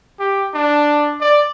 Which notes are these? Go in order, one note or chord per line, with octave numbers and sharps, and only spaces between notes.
G4
D4
D5